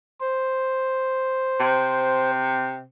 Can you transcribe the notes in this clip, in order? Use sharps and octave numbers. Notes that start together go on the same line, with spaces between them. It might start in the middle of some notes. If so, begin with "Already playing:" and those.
C5
C3